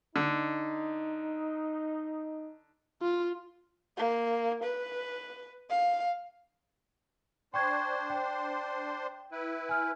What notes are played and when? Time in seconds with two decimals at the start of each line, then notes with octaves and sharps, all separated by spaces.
0.16 D3 D#4
3.02 F4
3.97 A#3
4.64 B4
5.70 F5
7.54 D4 C5 G5 C6 C#6 G#6
8.10 G5
9.32 E4 B4
9.69 G#5 F6